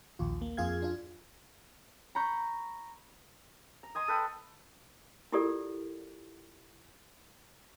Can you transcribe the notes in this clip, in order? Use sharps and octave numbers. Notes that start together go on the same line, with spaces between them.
A#1 D#2 F4
A#3
F2 F4 G#4 F5 G#6
D4 F4
A#5 B5 C#6 G6
A#5
D#5 G#5 C6 D#6
A4 B4 G5
E4 F4 G4 A4 A#4 D5